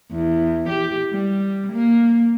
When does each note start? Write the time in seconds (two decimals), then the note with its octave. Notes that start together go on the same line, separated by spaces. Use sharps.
0.12 E2
0.69 G4
1.10 G3
1.72 A#3